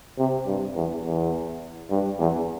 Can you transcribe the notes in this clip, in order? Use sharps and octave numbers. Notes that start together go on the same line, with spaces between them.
C3
G2
E2
E2
G2
E2